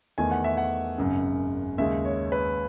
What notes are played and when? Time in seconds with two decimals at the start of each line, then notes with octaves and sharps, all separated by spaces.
0.18 E2 D#3 A3 G#5
0.31 F#5
0.44 E5
0.57 F#5
0.98 G#1 F#2 C#3
1.78 D#2 C#3 G#3 E5
2.05 C#5
2.32 B4